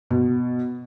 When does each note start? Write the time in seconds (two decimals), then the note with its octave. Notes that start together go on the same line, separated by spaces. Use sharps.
0.10 B2